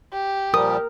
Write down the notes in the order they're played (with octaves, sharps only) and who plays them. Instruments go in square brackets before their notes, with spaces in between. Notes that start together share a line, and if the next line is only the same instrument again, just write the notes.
[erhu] G4
[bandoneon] A#2 F3 G3 [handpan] A#4 [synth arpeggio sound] D#6